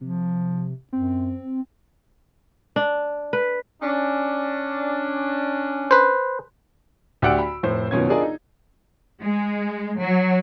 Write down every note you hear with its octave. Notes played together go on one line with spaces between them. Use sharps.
C3 F3
F#2 C4
D4
B4
C#4 D4
B4 C5
D2 G4 D5 F#5 E6 D7
B5
F1 A2 C5
F#1 B2 D#3 C#4 F4 G#6
D4 F4 G#4 A#4 D5 D#5
D#4
G#3
F#3